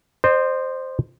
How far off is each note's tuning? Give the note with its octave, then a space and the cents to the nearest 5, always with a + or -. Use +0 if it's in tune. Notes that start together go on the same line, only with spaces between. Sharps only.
C5 +0 D#5 -45